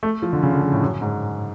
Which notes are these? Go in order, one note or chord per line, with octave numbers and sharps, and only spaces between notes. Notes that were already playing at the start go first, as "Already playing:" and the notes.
A3
F3
D3
C#3
D3
C#3
A2
F#2
G#2